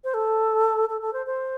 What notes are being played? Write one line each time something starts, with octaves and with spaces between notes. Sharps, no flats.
C5
A4
A4
A4
C5
C5